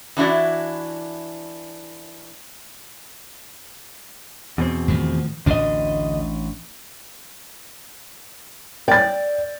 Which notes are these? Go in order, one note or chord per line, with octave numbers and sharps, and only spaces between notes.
E3 D4 E4 F#4 D5
E2 B2 C4
A2 D#3 F3
A1 D2 A2 D4 D#5
D5 G5 A6